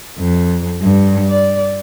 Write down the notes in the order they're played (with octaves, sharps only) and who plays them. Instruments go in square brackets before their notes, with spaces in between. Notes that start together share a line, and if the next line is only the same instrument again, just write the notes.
[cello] F2
G2
D5